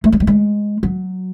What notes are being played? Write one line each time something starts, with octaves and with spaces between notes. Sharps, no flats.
A3
G#3
G3
G#3
F#3